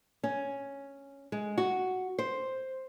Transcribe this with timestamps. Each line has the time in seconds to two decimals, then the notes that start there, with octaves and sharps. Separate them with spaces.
0.23 C#4
1.32 G#3
1.58 F#4
2.19 C5